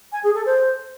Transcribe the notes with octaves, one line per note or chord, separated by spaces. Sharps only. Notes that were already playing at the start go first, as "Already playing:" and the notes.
G#5
G#4
A4
C5